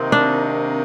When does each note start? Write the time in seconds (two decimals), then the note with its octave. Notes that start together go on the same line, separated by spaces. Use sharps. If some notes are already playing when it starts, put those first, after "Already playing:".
Already playing: C3 D#3 A#3 C4 D#4
0.12 D4